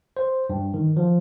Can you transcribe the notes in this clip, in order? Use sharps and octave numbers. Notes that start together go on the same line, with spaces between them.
C5
G2
D#3
F3